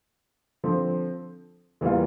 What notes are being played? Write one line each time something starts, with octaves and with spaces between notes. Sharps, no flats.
D3 F3 C4
E2 E3 G3 A#3 F4